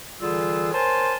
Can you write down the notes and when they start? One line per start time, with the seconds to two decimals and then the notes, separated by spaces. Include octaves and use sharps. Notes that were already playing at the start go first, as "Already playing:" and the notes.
0.20 D3 E3 G3 F4 G#4 E6
0.72 A#4 C5 C#5 G#5 A5 C6